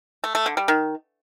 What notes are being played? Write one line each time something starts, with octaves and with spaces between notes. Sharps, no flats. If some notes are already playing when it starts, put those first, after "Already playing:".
A3
A3
D3
G3
D#3